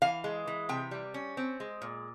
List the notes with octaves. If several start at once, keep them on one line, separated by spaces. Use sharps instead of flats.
E3 F5
G#3
E3
C3 G5
G3
C#4
C4
G#3
A#2